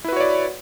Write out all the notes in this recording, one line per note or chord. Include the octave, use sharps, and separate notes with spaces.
E4 F#4 B4 C#5 D5